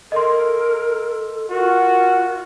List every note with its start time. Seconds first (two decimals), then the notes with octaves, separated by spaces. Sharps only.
0.12 A4 A#4 D#5 C6
1.50 F4 F#4 A#4